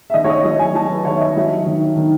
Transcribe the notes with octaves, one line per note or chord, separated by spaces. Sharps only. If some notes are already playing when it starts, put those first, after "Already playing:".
E5
D#3 D#5
C#5
D#5
F#3 D#5
G#5
F#3 A5
B4
D#3 C#5
E5
D#5
F#3 E5
D#3
D#3